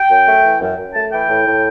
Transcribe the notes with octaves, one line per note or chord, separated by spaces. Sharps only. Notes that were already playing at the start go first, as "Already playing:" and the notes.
Already playing: G5
F#2
A3
E3
F#2
F#2
A3 A5
E3 G5
A2
A2